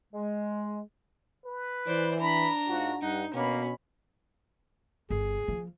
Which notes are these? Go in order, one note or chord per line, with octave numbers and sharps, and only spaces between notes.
G#3
B4
E3 C5 D5
D4 A#5 B5
G#2 F4 F#4
G2 D#4 F#5
B2 A#3 C#4 B5
G1 G#4
F3 A#3